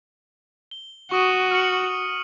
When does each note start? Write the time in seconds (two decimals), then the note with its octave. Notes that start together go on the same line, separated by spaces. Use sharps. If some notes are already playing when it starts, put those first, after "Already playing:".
0.71 G7
1.11 F#4 C#6 D#6 D#7
1.51 F6 C#7 F#7